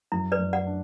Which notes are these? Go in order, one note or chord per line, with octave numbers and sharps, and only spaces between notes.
F#2 E4
B4 D5
F#2
D5 F#5
D4